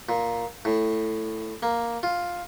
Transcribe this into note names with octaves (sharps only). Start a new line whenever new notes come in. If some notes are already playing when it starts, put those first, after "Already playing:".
A#2
A2
A#3
F4